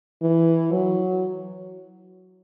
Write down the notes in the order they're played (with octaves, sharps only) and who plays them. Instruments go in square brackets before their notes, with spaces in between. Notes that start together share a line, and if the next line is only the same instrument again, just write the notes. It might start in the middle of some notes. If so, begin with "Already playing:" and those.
[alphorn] E3
F#3